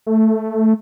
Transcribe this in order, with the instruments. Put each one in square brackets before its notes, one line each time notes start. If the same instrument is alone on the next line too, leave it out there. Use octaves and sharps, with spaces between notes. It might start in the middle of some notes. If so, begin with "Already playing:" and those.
[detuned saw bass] A3